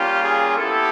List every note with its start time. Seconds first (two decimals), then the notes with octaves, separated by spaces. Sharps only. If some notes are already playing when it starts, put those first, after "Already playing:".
Already playing: G3 A#3 C#4 F4 G4
0.24 G#4
0.57 B3 E4 G4 A4